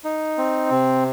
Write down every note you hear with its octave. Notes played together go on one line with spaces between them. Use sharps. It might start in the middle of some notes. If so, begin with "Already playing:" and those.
D#4
C4
C3